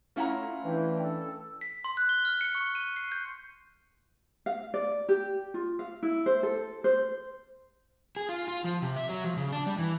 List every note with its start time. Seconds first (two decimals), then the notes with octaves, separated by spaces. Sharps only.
0.16 A3 C#4 E4 F4 F#5 A#5
0.65 E3 D4 G5
1.01 A4
1.61 B6
1.84 C6
1.97 F#6
2.09 G7
2.25 F6
2.41 C#7
2.55 C#6
2.75 D#7
2.96 C7
3.12 G6
4.46 F5
4.74 D5
5.09 G4
5.54 F4
5.79 F5
6.03 E4
6.26 C5
6.43 A4
6.84 C5
8.16 G#4
8.29 F4
8.48 F4
8.64 F3
8.82 C3
8.96 E5
9.09 F#3
9.24 F3
9.37 C#3
9.52 D4
9.66 G3
9.78 E3